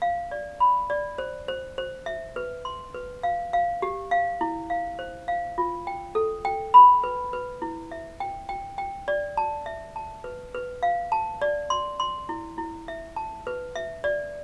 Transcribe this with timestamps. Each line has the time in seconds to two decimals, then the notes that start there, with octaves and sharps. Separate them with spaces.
0.02 F5
0.31 D5
0.60 B5
0.90 D5
1.18 C5
1.48 C5
1.78 C5
2.06 E5
2.36 B4
2.65 C6
2.95 B4
3.23 F5
3.53 F5
3.82 G4
4.11 F5
4.41 E4
4.70 F5
4.99 C5
5.28 F5
5.58 F4
5.87 G5
6.15 A4
6.45 G5
6.74 B5
7.04 B4
7.33 B4
7.62 E4
7.92 E5
8.20 G5
8.49 G5
8.78 G5
9.08 D5
9.37 A5
9.66 E5
9.96 A5
10.24 B4
10.55 B4
10.83 F5
11.12 A5
11.42 D5
11.70 C6
12.00 C6
12.29 E4
12.58 E4
12.88 E5
13.16 A5
13.47 B4
13.76 E5
14.04 D5